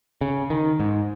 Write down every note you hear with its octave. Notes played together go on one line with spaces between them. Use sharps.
C#3
D#3
G#2